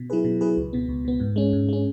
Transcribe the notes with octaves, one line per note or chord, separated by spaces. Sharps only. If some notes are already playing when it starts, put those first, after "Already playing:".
Already playing: B2
F#3 E4 G#4 B4
B2
F#3 E4 G#4 B4
C#2
B2 B3
C#2
B2 B3
G#2
G#3 C#4
G#2
G#3 C#4